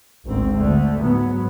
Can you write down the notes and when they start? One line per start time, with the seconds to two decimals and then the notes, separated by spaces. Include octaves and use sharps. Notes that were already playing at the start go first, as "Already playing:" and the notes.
0.24 G#1 D2 C4
0.56 D2 D3 A3
1.04 G#2 F#3 B3